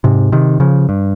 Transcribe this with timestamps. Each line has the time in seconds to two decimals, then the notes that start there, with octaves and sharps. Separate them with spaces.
0.04 G#2 C3
0.32 C3 D#3
0.60 C#3 F3
0.89 G2